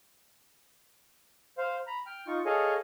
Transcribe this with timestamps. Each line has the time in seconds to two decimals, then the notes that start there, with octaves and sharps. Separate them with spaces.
1.58 C5 F5
1.87 A#5 B5
2.06 G5 F6
2.27 D#4 F4 C#6
2.46 G#4 A4 C#5 D#5 F5 G#5